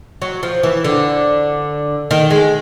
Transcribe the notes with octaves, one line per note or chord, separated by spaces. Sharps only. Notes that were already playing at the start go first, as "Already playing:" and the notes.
F#3
F3
E3
D3
D#3
G#3